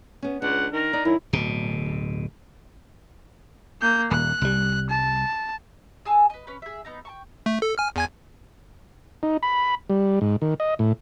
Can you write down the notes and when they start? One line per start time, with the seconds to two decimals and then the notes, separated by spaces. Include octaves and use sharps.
0.22 B3 C#4
0.42 C#2 D4 F#5
0.73 D#3 A#4
0.93 D#4 D5
1.05 F#2 D#3 E4
1.33 D1 B2
3.81 A#3 G6
4.11 D#1 F#6
4.41 C2 G3
4.90 A5
6.05 G#4 G#5 A5 E6
6.30 B4 D#5
6.47 C#4 B4
6.62 G#4 E5
6.85 B3 D#4 A#5
7.05 G5 A5 C#6
7.46 A3
7.62 A4
7.78 G#5 F6
7.96 E2 G#5 G#6
9.23 D#4
9.43 B5
9.90 G3
10.21 G#2
10.42 D#3
10.60 D#5
10.79 A2